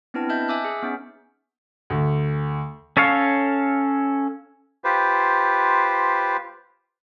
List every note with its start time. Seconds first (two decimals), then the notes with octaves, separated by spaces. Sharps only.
0.14 B3 C4 D4 E4 B4 A5
0.29 D#5 E5 A5 G6
0.48 E5 G#5 D6 E6 F#6
0.65 G#4
0.83 B3 C#4 D#4
1.90 D2
2.97 C#4 A4 C#5 F5
4.84 F4 G4 B4 C5